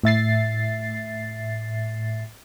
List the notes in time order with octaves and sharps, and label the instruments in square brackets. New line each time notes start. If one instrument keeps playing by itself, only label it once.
[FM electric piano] A2 E5 A6 C7